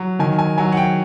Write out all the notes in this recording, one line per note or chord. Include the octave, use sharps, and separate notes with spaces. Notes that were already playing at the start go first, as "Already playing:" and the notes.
Already playing: F#3
D#3 G#5
G#5
F#3 G#5
F#5
G5